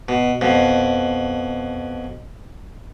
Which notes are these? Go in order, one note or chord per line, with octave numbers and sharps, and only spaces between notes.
B2
F2 B2